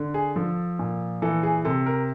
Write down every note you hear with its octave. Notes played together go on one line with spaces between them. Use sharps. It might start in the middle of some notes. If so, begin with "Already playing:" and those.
Already playing: D3
G#4
F3 A4
A#2
E3 A4
G#4
C3 A4
A#4